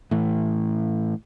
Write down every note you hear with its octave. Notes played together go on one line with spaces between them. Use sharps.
A2 E3